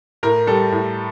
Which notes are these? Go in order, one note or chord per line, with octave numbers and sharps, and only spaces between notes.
A2 A#4
G3 A4
A2